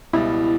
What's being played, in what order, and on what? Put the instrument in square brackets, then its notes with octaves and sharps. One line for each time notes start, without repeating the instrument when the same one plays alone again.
[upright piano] C#2 B2 G3 [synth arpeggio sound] E4